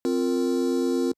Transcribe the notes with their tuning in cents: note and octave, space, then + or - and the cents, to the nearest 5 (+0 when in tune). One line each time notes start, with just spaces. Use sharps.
C4 +0 F4 +5 A#4 -15